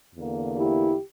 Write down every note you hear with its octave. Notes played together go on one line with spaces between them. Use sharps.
E2 D3 A#3
E4 G4